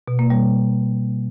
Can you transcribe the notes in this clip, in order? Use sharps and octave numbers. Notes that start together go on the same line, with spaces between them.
B2
A#3
G3